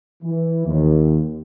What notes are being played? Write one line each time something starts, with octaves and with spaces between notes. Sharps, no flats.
E3
D#2